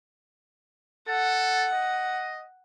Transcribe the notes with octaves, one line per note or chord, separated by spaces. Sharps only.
A4 F#5
D#5